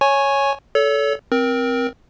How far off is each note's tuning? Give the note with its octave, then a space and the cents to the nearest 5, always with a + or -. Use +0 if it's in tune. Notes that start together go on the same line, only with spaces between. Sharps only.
C#5 +0 G#5 +5 C#6 -15
A4 -10 C#5 +35
C4 +0 A#4 +25